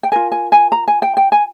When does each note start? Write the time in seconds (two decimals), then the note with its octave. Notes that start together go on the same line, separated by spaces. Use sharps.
0.03 G5
0.12 F4 A#4 G#5
0.32 G#5
0.52 G#5
0.72 A#5
0.88 G#5
1.02 G5
1.17 G5
1.32 G#5